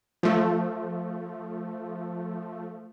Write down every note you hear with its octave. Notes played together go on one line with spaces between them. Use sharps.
F3 A3